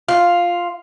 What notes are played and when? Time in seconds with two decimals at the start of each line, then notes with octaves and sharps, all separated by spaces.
0.09 F4